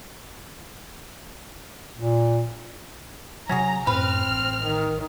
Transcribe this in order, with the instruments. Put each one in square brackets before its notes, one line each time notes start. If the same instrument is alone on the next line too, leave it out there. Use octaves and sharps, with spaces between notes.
[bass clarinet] A#2
[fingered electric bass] C3 F#3 [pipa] C#4 F#4 G#4 [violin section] A#5
[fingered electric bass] F#2 A2 [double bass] C4 [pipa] B4 [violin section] F6
[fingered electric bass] A1
[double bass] D#3